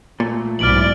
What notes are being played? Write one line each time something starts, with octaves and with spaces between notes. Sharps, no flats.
A#2 A3
B1 G#2 E4 D5 F6 D7 F#7